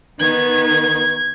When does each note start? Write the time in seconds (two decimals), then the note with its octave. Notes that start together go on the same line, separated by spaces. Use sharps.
0.19 D#3 B3 D#4 G#6